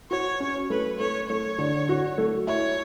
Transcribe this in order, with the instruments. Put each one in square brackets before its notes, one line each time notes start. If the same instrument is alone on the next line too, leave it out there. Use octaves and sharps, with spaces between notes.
[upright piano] F#4 [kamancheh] C#5
[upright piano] C#4
[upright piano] A3 [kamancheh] B4
[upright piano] A3 [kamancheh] C#5
[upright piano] A3 [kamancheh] C#5
[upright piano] D3
F#4
A3
[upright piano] E4 [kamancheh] C#5